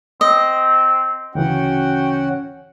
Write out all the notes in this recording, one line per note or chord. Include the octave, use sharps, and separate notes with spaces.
C4 D#5
D2 C#3 E3 C#4 F#4 F#5 G5